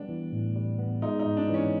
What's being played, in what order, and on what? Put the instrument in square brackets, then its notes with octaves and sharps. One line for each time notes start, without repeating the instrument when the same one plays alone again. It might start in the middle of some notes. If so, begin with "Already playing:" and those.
Already playing: [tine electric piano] G3 B3 [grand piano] D4
[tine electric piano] E3
A2
G3
B3
[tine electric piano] G#3 [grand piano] D#4
[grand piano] D#4
[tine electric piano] G#2
[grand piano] D4
[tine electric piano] E3
[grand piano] C#4